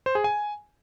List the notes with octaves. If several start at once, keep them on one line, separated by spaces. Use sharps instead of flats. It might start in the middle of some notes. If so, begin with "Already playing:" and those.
C5
G#4
G#5